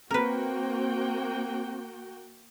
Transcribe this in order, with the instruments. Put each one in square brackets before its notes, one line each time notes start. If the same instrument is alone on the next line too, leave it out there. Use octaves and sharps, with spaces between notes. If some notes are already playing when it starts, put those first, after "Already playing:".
[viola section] A#3 F#4 G5 [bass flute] C4 [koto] A#4 B4